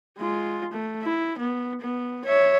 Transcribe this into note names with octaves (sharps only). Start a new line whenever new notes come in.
G#3 F4
A3
E4
B3
B3
C#5 E5